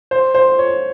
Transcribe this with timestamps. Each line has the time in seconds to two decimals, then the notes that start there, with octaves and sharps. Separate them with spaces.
0.11 C5
0.35 C5
0.59 C#5